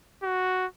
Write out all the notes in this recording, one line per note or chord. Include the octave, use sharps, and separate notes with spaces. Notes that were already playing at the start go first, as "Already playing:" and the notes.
F#4